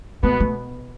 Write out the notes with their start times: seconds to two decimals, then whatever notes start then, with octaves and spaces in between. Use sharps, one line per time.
0.23 B2 A3 B3
0.40 A3